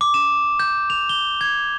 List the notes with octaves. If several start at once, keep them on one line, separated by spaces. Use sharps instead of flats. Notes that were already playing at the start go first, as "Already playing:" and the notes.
D6
E7
G6
F7
G7
G#6